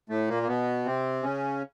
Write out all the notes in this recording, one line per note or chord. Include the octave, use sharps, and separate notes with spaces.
A2 A3
A#2 A#3
A#3
B2 B3
C3 C4
C#3 C#4